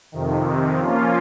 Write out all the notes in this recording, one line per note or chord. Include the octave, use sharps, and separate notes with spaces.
F2 C3 D#3
F3 A#3 C#4 F4